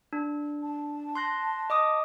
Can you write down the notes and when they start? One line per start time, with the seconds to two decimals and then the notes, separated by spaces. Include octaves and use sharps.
0.13 D4
0.63 A5
1.15 C6 F#6 A#6
1.70 D#5 D6 D#6